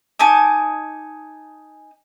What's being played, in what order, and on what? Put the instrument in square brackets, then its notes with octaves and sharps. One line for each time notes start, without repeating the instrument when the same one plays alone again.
[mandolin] D#4 G#5 A5 D6